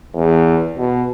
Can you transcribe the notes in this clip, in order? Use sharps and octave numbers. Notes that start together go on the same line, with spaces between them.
E2
B2